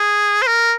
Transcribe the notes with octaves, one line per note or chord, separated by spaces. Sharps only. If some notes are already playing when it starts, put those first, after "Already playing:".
Already playing: G#4
C5
A#4